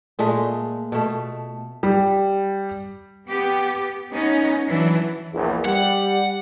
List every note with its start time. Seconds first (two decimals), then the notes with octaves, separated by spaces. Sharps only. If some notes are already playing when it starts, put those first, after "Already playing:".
0.19 A#2 G#3 A3
0.92 B2 A3
1.83 G3
3.28 B3 G4
4.11 B3 C#4 D#4
4.66 E3 F#3 D4
5.34 A#1 E2
5.65 G3 F#5